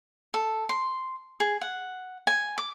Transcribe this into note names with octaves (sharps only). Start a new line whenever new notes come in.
A4
C6
G#4
F#5
G#5
D6